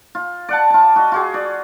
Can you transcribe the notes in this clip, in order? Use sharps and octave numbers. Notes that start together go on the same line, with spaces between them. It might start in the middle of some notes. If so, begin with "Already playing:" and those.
F4
D5 F#5 A5
F4 A5
F#4 D#5
F4 F#4 G#4
D5